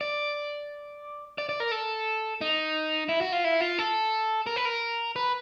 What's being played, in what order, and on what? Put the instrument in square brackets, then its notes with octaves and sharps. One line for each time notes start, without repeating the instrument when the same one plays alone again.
[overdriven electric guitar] D5
D5
D5
A#4
A4
D#4
E4
F#4
F4
E4
F4
A4
A#4
B4
A#4
B4